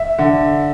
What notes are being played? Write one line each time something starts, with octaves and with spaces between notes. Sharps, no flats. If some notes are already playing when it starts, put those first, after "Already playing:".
Already playing: E5
D3